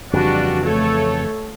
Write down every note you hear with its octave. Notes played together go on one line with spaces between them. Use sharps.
F2 C#3 E3 G3 D4 F#4
A3 A4 C#5